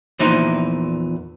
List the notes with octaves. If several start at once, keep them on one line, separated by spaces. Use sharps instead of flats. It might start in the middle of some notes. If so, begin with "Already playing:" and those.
E2 A#2 E3 F3 D#4